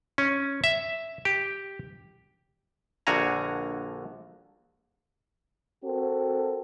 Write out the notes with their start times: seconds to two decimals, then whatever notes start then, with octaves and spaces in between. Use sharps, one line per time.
0.18 C#4
0.64 E5
1.25 G4
3.07 A#1 D3 F#4 F5 G#5 A#5
5.84 C4 F#4 A4 A#4